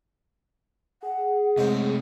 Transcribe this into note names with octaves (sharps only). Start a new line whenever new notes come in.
G#4 F#5
C3 G#3 A3 C#4 C5